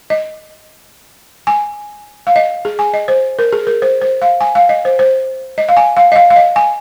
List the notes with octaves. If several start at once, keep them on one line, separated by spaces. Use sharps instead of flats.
D#5
G#5
F5
D#5
G#4
G#5
D#5
C5
A#4
G#4
A#4
C5
C5
F5
G#5
F5
D#5
C5
C5
D#5
F5
G#5
F5
D#5
F5
F5
D#5
G#5